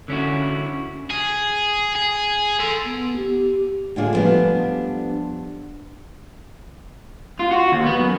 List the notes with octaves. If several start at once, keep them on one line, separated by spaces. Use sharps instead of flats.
D3 C#4 E4 F#4
G#4
G#4
A4 C6
B3
G4
A2 D3 D4 F4 G#4 D5
D3 F3 G3 A3 B3 D4
F4
F#4
D#2
B3
F#2